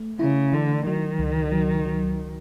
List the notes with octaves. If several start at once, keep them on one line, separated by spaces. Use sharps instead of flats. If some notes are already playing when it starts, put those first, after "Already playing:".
Already playing: A3
C#3 E4
D3 E3
D#3 F#3
C#2
F#3
F#3